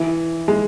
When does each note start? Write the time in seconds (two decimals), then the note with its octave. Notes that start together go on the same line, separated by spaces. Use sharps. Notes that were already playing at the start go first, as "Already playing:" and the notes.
Already playing: E3
0.48 G#3